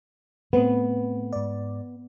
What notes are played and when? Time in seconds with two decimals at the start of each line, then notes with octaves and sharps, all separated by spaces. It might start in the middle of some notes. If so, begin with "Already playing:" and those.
0.53 A2 A3 B3 C4
1.33 G#2 D5